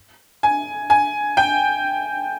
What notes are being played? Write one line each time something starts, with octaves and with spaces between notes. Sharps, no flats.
G#5
G#5
G5